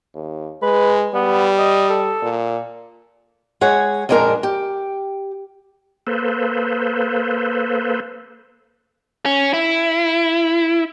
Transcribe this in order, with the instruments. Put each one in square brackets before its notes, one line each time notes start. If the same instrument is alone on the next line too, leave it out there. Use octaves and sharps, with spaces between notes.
[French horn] D#2
[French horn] G#3 [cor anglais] B4
[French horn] G3 [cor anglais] B3
[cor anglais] D#5
A4
[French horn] A#2
[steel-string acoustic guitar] G#3 G#4 C#5 F#5
F2 A#2 G#3 D4 A#4 A#5
G4
[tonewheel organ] A#3 A4 B4 C5
[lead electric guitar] C#4
E4